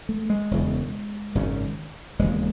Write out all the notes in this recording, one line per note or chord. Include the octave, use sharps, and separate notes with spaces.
A3
G#3
E1 E2 C#3
G#1 F#2 C#3
E1 D#2 C#3 G#3